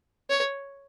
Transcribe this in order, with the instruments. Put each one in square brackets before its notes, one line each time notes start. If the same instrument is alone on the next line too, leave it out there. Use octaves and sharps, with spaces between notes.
[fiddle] C#5